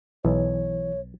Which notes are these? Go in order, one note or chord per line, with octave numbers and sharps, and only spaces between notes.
B1 E3 C#5